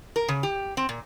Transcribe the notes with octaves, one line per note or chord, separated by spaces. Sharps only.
A#4
C#3
G4
C4
A#2